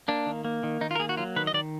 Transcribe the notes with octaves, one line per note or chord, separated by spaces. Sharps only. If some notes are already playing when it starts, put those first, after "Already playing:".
A#3 D4
D#3
A#3
D#3
D#3 D#4
F4
A#4
A#3 G#4
F#4
F#3 F4
D#3 B4
D#5
D#3 D5